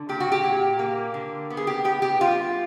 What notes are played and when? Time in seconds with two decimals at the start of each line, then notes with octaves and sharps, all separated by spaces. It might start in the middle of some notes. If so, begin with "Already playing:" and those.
Already playing: D3
0.09 A#2 G4
0.20 F#4
0.32 G4
0.44 A#2
0.79 A#3
1.14 D3
1.50 B3
1.57 G#4
1.67 G4
1.84 B3 G4
2.02 G4
2.20 G3 F4